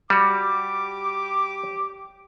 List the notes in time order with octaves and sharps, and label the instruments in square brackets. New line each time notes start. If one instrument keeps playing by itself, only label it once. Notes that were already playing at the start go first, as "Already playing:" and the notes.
[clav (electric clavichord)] G3 F#4 [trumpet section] G4 D6